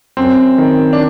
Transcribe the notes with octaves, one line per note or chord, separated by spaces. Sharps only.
F#2 C4
D#3
D4